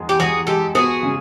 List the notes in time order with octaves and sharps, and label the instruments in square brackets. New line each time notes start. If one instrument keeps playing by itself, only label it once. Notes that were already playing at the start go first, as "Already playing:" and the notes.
Already playing: [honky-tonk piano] E2 G#3
[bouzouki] G4
[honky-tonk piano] E2 [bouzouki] F#4 G#4
[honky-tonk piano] G#3 [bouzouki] G4 A4
[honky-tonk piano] B3 [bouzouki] F#4 G#4
[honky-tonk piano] C#3